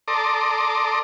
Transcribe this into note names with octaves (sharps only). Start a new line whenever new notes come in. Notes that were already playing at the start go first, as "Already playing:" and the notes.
A4 D5 A#5 C6 D6 D#6